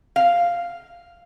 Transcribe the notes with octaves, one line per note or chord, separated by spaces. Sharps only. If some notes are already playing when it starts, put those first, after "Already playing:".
F5